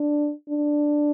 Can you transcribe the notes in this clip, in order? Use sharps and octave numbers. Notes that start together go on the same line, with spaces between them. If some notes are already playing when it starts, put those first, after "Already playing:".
Already playing: D4
D4